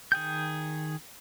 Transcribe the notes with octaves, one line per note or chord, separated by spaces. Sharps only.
D#3 G#4 G5 G6